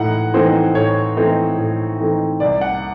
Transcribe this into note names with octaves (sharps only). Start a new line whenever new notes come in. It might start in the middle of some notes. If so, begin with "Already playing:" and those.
Already playing: A2 E3 D#4 F#5 A#5
E3 A3 C4 D#4 C5
A2 C#5
E3 A3 C4 D#4
A2
E3 A3 C4 D#4
C2 D5
F#5